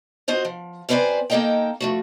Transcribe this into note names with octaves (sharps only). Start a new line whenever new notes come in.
F4 F#4 C5 D#5
F3
F#2 C4 B4 C5 D5 G#5
A#3 D#4 A4 A#4 D#5 G5
F3 A3 F#4